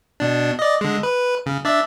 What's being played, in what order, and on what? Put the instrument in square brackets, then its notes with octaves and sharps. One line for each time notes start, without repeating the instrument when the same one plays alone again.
[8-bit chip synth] B2 D4
D5 D#5
D3 G#3
B4
C#3
D4 D5 E5